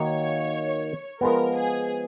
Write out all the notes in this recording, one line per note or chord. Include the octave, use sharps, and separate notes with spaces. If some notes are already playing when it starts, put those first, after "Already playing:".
Already playing: D#3 A#3 D#4 F#4 C#5
F3 G#3 B3 A#4
G#4